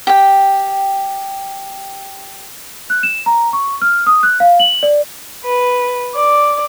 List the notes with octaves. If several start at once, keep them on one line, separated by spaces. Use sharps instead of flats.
G4 G5
F#6
E7
A#5
C#6
F6
D#6
F#6
F5
F#7
D5
B4
D5